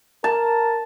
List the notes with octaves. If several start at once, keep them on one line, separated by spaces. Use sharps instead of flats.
A#4 A5